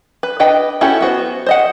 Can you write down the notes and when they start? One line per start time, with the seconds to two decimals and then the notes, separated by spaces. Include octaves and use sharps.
0.23 B4
0.40 D4 B4 D#5 G5
0.81 C#4 E4 F#4 G4 A4
1.01 B3 F#4 C5
1.46 C5 D#5 F#5